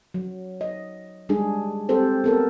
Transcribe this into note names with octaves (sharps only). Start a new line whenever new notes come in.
F#3
D#5
G3 G#3 D4 G#4
C4 G4 A4 C5
B3 A4 A#4